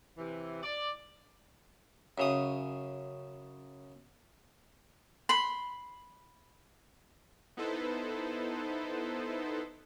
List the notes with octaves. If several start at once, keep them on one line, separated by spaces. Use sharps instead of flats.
C3 E3
D5
F#2 C#3 D#6
B5 C6
B3 D#4 E4 A4 B4 C5